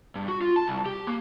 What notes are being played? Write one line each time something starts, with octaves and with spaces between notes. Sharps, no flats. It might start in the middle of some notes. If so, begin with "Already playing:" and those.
G2
F#4
F4
A5
C2
G4
A#3